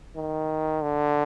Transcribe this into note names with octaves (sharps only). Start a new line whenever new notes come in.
D#3
D3